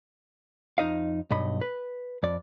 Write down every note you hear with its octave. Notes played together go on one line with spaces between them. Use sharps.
F2 D#4 D#5 F5
B1 G2 D#5 B5
B4
F2 D5